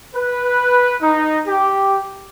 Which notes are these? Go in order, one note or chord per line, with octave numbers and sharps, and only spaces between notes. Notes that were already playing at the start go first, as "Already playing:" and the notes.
B4
D#4
G4